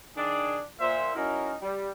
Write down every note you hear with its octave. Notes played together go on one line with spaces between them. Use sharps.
D#3 D4 G#4
A#2 C5 E5
F#3 C#4 D#4 E4 A#4
G3